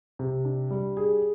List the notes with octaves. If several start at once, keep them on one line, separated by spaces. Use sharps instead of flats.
C3
D4
G3
G#4